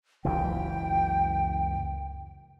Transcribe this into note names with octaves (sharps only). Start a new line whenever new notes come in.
F#1 C#2 E3 G5